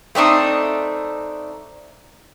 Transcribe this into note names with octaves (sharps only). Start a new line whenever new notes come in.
A3 C4 D4 D#4